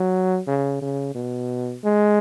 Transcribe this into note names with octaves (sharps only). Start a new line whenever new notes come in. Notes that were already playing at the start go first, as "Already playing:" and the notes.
Already playing: F#3
C#3
C#3
B2
G#3